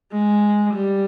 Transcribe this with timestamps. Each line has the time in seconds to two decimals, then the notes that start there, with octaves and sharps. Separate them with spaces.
0.12 G#3
0.74 G3